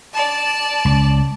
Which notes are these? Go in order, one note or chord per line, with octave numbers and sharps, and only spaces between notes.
D5 A5
C#2